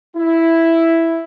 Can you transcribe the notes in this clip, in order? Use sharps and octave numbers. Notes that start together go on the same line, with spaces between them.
E4